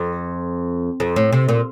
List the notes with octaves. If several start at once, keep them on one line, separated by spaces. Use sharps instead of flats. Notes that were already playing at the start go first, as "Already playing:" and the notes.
Already playing: F2
F2
A2
C3
A#2